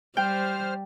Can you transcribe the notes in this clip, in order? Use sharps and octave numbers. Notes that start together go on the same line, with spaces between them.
G3 C5 G5 F6